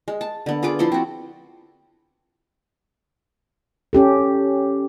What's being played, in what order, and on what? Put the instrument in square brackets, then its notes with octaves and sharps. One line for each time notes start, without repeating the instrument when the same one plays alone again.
[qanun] G#3
A5
D3 B3
F4 G#4 B4 D6
F3 E4 A4 C6
C4 F#4
[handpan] C#4 G4 A4